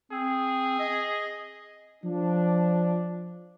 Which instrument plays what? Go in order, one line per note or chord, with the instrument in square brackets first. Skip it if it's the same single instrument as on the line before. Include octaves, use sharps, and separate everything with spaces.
[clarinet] C4 [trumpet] G#4
[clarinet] D#5
[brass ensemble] F3 D4